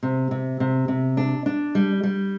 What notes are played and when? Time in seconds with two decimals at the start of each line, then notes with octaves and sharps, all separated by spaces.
0.03 C3
0.31 C3
0.60 C3
0.88 C3
1.17 D4
1.46 D4
1.75 G3
2.03 G3